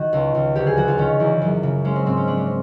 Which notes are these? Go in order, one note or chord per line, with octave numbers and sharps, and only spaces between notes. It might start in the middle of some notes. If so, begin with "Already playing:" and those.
Already playing: D#3 F#4
C#2
C#2
D2 G4
G#4
F3 F#4
F4
D#3 C#4
E2
F#2
C#3
G#3 C#4
C4
G#2 C4
C#4
F3 D4
C#4
C4